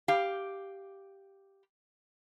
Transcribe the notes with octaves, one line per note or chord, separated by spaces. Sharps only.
G4 F5